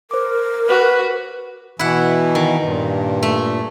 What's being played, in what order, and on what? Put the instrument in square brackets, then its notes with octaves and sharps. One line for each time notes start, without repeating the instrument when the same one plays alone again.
[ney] A#4 [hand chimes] C5 D6
[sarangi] F#4 [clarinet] B4
[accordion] B2 E3 [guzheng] E4 F#5
[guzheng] D#3
[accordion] G2 A#2
[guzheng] A3